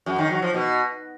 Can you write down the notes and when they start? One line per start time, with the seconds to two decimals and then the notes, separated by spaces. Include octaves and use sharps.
0.06 F#2
0.18 D#3
0.30 F#3
0.42 F3
0.54 B2